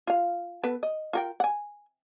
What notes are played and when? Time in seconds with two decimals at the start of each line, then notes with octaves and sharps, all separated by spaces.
0.07 F4 F5
0.63 B3 A4 B4
0.83 D#5
1.13 F4 A#4 G5
1.40 F#5 G#5